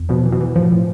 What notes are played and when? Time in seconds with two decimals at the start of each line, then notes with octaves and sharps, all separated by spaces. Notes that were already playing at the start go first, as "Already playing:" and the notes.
Already playing: E2
0.09 B2 F3
0.26 E3
0.32 B2
0.41 E3
0.56 A2 F3
0.72 A2